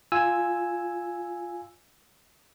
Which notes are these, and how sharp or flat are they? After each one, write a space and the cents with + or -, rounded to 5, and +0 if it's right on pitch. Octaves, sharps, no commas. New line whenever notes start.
F4 +0 G#5 +0 E6 +0